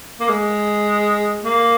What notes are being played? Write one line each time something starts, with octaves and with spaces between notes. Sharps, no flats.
A#3
G#3
A#3